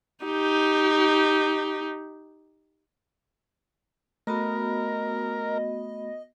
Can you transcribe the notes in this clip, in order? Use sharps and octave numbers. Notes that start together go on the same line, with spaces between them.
D#4 G4
A3 B3 F#4 A#4 D#5 B5